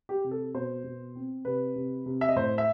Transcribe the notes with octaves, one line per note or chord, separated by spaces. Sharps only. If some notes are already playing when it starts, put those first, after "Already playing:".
G4
C3
A4
B2 C5
B2
C4
C3 B4
C3
C3
E5
D#5
A2 C5
E5